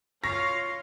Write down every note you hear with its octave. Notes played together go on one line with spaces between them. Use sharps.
F4 C#5 F5 C#6 A#6